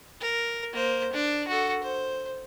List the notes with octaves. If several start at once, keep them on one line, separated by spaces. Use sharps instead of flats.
A#4
A#3 C5
D4
F#4 A4
C5